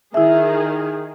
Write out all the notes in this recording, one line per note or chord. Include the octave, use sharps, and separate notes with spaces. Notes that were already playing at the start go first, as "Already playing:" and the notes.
D#3 E4 G#4 E5